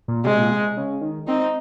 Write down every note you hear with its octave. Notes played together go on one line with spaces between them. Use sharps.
A#2
C3 G#3
A#2
C3
C#3
D#3
C4 D#4